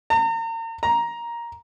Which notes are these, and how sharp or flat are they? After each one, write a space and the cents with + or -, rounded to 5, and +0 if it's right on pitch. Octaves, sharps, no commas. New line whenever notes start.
A#5 -40
A#5 +10